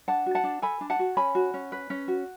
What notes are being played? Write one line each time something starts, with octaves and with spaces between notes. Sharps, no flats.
D4 F#5 A5
F#4
F#5 A5
D4
A4 G#5 B5
D4
F#5 A5
F#4
C#4 G#5 B5
F#4
C#4
B4
C#4
F#4